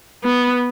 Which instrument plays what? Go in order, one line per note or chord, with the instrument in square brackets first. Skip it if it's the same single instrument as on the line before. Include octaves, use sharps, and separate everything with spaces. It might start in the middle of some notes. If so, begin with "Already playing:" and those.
[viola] B3